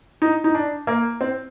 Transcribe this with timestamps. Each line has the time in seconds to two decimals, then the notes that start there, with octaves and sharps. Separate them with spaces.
0.22 D#4
0.44 D#4
0.54 D4
0.87 A#3
1.21 C4